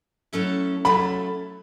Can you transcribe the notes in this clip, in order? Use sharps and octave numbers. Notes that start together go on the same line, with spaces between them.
F#3 A3 C#4 E4 A4
F#3 A3 C#4 E4 A4 B5